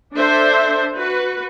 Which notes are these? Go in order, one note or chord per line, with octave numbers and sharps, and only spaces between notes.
D4 A4 C5 E5
F#4 B4